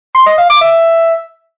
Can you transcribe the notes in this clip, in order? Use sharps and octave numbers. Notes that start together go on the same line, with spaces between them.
C6
D#5
F5
D6
E5